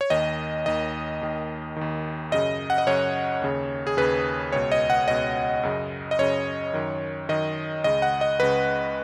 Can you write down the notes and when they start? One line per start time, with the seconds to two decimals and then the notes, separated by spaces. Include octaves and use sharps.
0.01 C#5
0.10 D#2 D#3 D#5
0.66 D#2 D#3 D#5
1.21 D#2 D#3
1.76 D#2 D#3
2.31 F#2 C#3 D#5
2.70 F#5
2.78 D#5
2.87 F#2 C#3 C#5
3.42 D#2 C#3
3.87 G#4
3.97 D#2 C#3 B4
4.52 C#2 B2 C#5
4.72 D#5
4.90 F#5
5.08 C#2 B2 D#5
5.63 F#2 C#3
6.11 D#5
6.19 F#2 C#3 C#5
6.74 F#2 D#3
7.29 F#2 D#3 D#5
7.84 C#2 C#3 D#5
8.02 F#5
8.21 D#5
8.40 C#2 C#3 B4